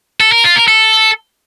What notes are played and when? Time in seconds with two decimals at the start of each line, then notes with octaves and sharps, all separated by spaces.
0.20 A4
0.32 A#4
0.44 F4
0.56 A#4
0.68 A4